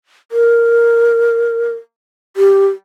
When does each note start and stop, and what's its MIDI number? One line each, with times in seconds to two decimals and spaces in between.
0.32 1.70 70
2.37 2.67 67